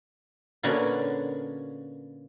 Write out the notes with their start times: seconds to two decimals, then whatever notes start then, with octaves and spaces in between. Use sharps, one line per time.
0.63 A#2 D3 B3 C#4 F#4